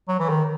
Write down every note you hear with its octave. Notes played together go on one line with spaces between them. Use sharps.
F#3
E3
D#3